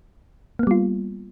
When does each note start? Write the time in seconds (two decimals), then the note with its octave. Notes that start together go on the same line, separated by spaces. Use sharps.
0.59 A#3
0.63 B3
0.67 G3
0.71 F4